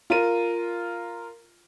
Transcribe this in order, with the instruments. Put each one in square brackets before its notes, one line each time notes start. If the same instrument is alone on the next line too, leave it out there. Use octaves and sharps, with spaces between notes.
[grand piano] F4 A#4 D#7